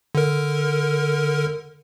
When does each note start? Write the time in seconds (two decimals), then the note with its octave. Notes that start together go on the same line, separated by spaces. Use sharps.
0.15 D3 A#4